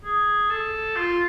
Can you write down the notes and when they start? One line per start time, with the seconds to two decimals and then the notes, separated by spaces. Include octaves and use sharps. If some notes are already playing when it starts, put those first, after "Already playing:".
0.05 G#4
0.50 A4
0.96 F4